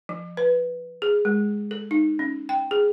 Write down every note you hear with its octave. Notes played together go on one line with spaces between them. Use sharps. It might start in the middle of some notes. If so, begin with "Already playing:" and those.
F3
B4
G#4
G#3
A4
D#4
C#4
G5
G#4